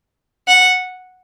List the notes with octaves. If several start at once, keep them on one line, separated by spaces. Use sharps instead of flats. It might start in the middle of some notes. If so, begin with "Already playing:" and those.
F#5